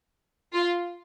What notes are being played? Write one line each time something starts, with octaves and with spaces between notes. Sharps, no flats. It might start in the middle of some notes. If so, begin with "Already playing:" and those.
F4